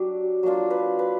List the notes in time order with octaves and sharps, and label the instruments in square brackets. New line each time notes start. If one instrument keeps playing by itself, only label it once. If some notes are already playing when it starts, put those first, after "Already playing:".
Already playing: [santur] F#3 D4 G4
F#3 A#3 D4 F4
B4
B4